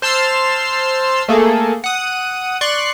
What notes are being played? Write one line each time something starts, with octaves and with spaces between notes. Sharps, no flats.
C5 A5 C6 E6 F6 C7
A3 A#3 G#4 A4
F#5 D#6
D5 C6 C#6 F#6